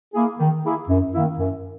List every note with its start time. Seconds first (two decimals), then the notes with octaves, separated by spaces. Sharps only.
0.14 A#3 E4 G#4
0.39 D#3
0.64 A#3 E4 G#4
0.89 F#2
1.14 D#3 A#3 E4
1.39 F#2